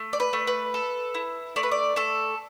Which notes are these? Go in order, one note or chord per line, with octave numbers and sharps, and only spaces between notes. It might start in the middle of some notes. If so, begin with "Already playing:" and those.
Already playing: A3
D5
B4
A3
B4
A4
E4
A3 D5
B4
D5
A3 A4